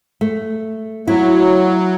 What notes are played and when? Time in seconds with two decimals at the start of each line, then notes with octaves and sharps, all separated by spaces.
0.21 A3
1.08 F#3 E4